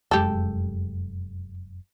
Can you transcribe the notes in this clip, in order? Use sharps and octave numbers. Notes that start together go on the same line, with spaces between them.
F1 F#2 G#3 G4 A4